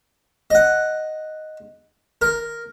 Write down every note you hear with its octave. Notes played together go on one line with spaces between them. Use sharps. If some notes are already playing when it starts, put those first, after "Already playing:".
D#5 F#5
A#4